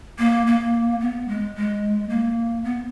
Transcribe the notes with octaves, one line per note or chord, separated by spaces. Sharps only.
A#3
A#3
B3
G#3
G#3
A#3
B3